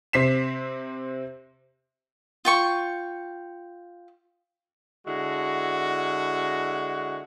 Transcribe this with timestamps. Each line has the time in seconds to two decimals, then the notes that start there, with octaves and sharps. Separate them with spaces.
0.13 C3 C4 B6 C7 E7
2.45 F4 G5 C#6
5.07 D3 G#3 E4 F#4